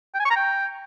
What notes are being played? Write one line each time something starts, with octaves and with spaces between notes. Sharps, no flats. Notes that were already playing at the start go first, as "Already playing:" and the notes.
G5
G#5
C#6
A#5
G5